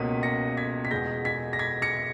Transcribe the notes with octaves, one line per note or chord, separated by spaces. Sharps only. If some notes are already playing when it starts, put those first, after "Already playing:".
Already playing: C#2 B2 A#3 C#4 B6 D#7
A#6 C#7
G#6 B6
B6
E2 B2 G#3 G6 A#6
G#6 B6
A#6
G#6 B6
A#6 C#7